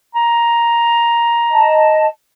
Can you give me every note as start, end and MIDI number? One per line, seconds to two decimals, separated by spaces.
0.15 2.00 82
1.51 2.06 75
1.51 2.06 81